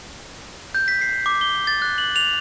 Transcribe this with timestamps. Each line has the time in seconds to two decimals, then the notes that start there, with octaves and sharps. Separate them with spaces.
0.75 G6
0.88 B6
1.02 C7
1.26 D6
1.41 G7
1.67 A6
1.82 F#6
1.98 F#7
2.16 F7